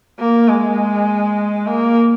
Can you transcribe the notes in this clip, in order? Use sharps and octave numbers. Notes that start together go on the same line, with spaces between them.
A#3
G#3
A#3